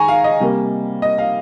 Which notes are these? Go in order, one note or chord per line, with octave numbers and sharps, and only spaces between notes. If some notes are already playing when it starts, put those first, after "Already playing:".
Already playing: D#3 G#3 G#5 A#5 C#6
F5
D#5
C3 G3 A#3
D#5
F5